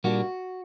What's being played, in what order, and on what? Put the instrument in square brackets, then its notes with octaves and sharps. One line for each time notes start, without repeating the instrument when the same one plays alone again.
[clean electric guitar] A#2 G3 A#3 D4 F#4